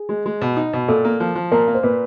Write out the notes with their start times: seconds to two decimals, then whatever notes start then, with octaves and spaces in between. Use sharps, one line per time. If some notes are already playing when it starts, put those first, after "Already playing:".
Already playing: G#4
0.09 G#3
0.26 G#3
0.41 B2
0.56 D#4
0.73 B2
0.88 A#2 A4
1.05 A#3
1.20 F3
1.35 F3
1.52 A#2 A#4
1.68 A#3
1.75 C5
1.83 A#2 B4